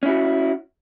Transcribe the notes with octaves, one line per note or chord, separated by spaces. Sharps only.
C#4 E4 F#4